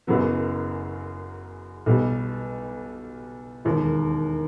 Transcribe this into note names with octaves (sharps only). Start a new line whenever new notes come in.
F#1 F#2 C#3 F#3 B3
B1 B2 G3
E1 D#2 D#3